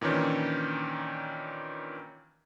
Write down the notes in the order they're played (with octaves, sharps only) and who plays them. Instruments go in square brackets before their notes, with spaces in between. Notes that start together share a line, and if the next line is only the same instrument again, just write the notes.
[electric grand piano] A#2 D#3 E3 C#4 D4